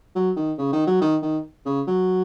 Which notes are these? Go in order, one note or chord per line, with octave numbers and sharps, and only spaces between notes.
F#3
D#3
C#3
D#3
F#3
D#3
D#3
C#3
F#3